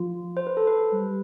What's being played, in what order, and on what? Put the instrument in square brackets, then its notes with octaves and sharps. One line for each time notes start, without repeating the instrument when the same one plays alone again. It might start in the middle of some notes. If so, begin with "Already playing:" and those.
Already playing: [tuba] F3 [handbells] F4
[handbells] C5
B4
A4
B4
[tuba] G3